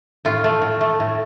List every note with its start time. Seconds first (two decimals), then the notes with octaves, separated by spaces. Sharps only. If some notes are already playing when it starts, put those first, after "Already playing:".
0.25 A2 F4
0.44 A3
0.62 A2
0.81 A3
1.00 A2